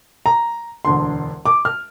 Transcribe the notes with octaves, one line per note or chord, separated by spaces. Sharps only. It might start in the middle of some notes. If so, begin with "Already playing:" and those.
A#5
E1 D2 D3 C6
D6
F6